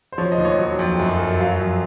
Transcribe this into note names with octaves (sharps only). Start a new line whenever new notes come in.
C5
F3 C#5
D#5
D#2
C#5
F#3
F2
F#2
F#2
F#3 F5
F2